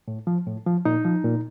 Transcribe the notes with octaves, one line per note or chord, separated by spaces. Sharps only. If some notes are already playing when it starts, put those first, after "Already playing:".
A2
F3
A2
F3
A#2 D#4
F3
A#2